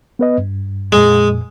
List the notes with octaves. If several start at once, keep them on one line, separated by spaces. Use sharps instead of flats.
B3 B4 D#5
G2
F2 A#2 G#3